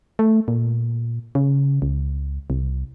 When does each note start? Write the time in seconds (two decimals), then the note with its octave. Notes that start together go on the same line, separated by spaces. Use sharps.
0.19 A3
0.48 A#2
1.35 C#3
1.82 C#2
2.50 C2